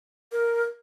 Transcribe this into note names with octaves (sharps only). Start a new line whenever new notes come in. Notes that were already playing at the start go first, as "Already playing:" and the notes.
A#4